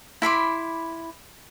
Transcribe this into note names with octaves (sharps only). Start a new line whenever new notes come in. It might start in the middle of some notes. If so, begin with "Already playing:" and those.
E4 B5 C6 D6